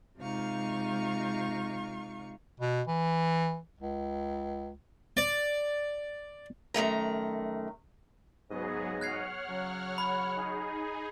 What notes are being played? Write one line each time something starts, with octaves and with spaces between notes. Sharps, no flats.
C3 G#3 D#4 F4 F5 C#6
B2
E3
C#2
D5
F#2 D#3 A3 A#5
G#2 C#3 F#3 B3 G#4 D#5
C#5 F#5 F6 F#6 G#6 C7
C#3 F#3
B5
D#4 G#4